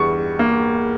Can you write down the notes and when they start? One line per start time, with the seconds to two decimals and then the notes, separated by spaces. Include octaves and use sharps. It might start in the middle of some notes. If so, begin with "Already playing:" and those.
Already playing: E2 G3 C#6
0.39 A#3